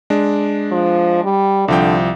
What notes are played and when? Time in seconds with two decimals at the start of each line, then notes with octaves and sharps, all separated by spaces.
0.10 G#3 D4
0.72 F3
1.24 G3
1.68 C2 D3 F3 G5